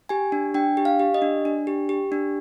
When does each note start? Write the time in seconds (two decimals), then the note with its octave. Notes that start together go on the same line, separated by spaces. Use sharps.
0.09 G4 G#5
0.32 D4
0.54 D4 G5
0.77 G4
0.85 F5
0.99 G4
1.14 D#5
1.22 D4
1.45 D4
1.67 G4
1.89 G4
2.12 D4